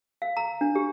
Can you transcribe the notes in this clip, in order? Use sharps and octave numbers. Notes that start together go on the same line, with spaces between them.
F5
A#5
D4
G4